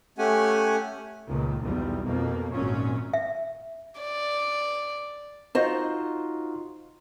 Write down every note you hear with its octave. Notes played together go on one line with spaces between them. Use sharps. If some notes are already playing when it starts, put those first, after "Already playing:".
A3 C#4 G4 F#5 G#5
C#2 A#2 D#3
B1 E2 G3
F2 B2 A#3
G#1 F#2 A#2 F#3 C#4
E5
D5
D#4 F4 F#4 C5 D#5